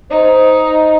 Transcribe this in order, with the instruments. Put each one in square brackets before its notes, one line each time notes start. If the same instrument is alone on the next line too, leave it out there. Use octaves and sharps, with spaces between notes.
[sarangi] D#4 [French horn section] C5